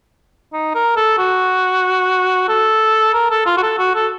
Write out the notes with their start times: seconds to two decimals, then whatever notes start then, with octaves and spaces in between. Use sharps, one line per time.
0.53 D#4
0.74 A#4
0.96 A4
1.18 F#4
2.48 A4
3.14 A#4
3.30 A4
3.46 F4
3.57 F#4
3.63 A4
3.79 F#4
3.95 A4